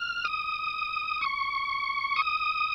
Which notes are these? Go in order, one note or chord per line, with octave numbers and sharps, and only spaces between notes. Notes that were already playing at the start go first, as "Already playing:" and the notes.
Already playing: F6
D#6
C#6
D#6